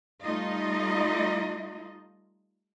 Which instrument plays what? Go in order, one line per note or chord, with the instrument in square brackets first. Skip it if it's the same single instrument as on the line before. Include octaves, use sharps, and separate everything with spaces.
[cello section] G3 A3 D#4 F4 D#5